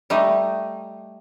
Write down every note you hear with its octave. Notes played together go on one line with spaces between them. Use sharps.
G3 A3 D#4 D#5